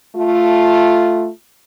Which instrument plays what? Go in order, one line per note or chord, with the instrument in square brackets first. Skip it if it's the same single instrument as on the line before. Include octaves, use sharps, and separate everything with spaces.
[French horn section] A3 F4